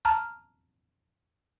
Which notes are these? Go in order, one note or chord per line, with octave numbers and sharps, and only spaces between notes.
A5 A#5 F6